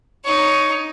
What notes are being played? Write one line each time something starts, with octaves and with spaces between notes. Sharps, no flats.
D#4 C#5